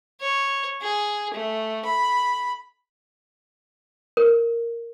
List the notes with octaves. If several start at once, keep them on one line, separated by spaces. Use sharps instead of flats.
C#5
G#4
A3
B5
A#4